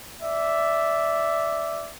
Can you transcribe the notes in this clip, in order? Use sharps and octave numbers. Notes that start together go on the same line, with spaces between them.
D5 E5